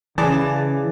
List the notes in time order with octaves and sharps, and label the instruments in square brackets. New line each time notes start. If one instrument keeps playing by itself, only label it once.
[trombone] C#3 [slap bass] E3 [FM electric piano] G#4 D5 A5